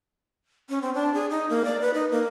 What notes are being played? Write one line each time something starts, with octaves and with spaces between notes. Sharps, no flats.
C#4
C4
D4
G#4
D#4
A#3
D5
B4
D#4
A#3